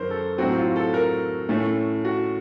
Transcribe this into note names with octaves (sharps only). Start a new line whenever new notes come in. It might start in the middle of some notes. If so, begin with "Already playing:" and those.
Already playing: F#2 D#3 C#4 A#4 C5
A4
A2 F#3 C4 F#4
F4
A4
A#4
A2 A3 C#4
F#4